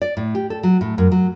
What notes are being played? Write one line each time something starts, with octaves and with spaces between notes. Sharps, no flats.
D5
A2
G4
A4
F#3
A2
F#2
F#3